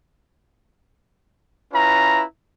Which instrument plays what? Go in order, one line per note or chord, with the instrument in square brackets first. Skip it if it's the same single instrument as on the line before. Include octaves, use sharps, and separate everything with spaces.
[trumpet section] C#4 E4 F4 B4 A#5